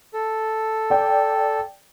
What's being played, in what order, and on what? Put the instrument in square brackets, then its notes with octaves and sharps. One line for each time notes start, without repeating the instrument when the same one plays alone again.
[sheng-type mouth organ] A4
[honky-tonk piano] D5 G5